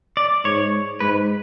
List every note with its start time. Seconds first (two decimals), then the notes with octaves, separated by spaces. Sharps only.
0.17 D5
0.45 G#2 C#5
1.00 G#2 B4